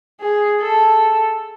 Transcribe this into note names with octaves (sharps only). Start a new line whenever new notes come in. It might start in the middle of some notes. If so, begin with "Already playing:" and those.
G#4
A4